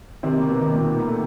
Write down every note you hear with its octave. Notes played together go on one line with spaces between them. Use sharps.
C3 D#3 C4
A#3
B2 B3
D#3
A#2 A#3
A#3 B3
A3